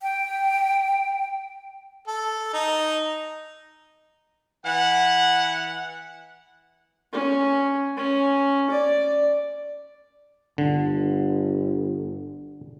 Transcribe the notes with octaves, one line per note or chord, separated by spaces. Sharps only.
G5
A4
D#4
E3 F#5
C#4
C#4
D5
G1 D3